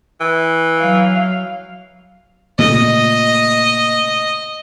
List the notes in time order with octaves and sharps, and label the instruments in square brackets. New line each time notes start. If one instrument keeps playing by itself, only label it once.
[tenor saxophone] E3
[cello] F#3 F5
[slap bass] A#2 C#3 A3 [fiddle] D#5